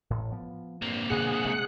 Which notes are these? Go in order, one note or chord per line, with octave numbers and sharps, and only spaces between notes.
A1 A2
F3 B3
G2 A#3 C4
G2 B2 D3 G#4 F#5 F#6
C3 G#3 A3